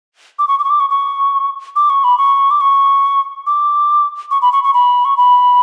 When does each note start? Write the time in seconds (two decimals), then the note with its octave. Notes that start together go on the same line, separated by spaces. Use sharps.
0.39 D6
0.48 C#6
0.59 D6
0.64 C#6
0.70 D6
0.80 C#6
0.90 C#6
1.76 D6
1.90 C#6
2.04 B5
2.18 C#6
2.51 D6
2.61 C#6
3.47 D6
4.31 C#6
4.42 B5
4.52 C#6
4.64 C#6
4.74 B5
5.05 C#6
5.17 B5